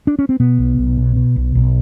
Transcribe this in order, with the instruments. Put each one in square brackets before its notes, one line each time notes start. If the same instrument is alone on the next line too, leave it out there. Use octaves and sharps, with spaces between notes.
[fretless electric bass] D4
C#4
C4
B2 B3
B1
B1
B2
B2
B1
B1